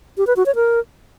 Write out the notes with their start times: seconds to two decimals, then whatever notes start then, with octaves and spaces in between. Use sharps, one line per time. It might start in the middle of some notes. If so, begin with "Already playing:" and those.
0.18 G4
0.27 B4
0.36 F#4
0.46 C#5
0.55 A#4